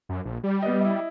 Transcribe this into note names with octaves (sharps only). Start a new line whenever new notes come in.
F#2
A#1
G3
B3 D#5
E4 D#5